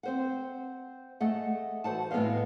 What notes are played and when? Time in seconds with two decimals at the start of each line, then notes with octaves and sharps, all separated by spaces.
0.03 C4 C5 F#5
1.20 A3 G#4 D#5 F#5
1.84 E3 F#4 C5 F#5 A5
2.11 A2 B3 G#4 D#5 F5